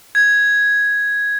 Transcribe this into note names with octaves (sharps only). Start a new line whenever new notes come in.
G#6